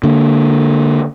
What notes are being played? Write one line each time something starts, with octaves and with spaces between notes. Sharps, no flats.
D3 A#3